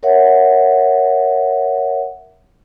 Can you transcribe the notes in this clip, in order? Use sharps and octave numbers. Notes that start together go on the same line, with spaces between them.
A#4 C#5 E5 F#5